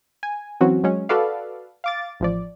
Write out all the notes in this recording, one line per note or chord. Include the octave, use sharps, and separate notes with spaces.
G#5
E3 F#3 C4 C#4 F#4
F#3 G#3 C#4
F#4 A4 B4 D5 F5
F5 D6 A6
A1 F3 D5